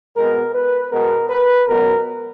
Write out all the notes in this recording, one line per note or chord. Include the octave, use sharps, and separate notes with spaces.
B2 G#3 B3 A#4
B4
B2 G#3 B3 A#4
B4
C#2 B2 F#3 B3 A#4